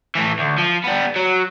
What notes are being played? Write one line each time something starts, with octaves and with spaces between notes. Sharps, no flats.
A2 E3
D2
F3
G3 B3
F#3